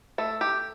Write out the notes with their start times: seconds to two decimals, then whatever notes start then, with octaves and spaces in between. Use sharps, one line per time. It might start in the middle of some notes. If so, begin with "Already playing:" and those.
0.18 A3 A4
0.41 G4